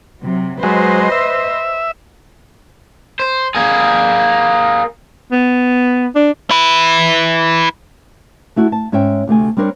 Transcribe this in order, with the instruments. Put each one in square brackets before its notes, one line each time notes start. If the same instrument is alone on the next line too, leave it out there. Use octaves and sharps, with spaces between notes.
[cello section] C3 F#3
[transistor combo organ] F#3 G#3 [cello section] B4 C5 D#5
[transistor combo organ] E5
[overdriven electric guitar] C5
A#3 G#4
[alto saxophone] B3
D4
[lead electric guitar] E4 B4
[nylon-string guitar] A3 E4 F#4
A5
G#2 C#4 C#5 E5 G5
D2 C3 A3 G#5
G3 C4 D4 A#4 C#5